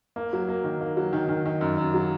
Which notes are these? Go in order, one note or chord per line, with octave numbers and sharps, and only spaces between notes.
A#3
F#3
A#3
D#3
A#3
F#3
D#3
D#3
D#3
F#2
F#2
F#3